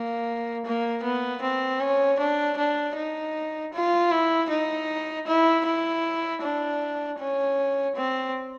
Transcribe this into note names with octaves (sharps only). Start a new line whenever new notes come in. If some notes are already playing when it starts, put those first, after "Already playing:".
Already playing: A#3
A#3
B3
C4
C#4
D4
D4
D#4
F4
E4
D#4
E4
E4
D4
C#4
C4